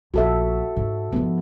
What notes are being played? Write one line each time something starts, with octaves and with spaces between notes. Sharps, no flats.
A#1 F#4 A4 E5
G#2
G#2 F3 B3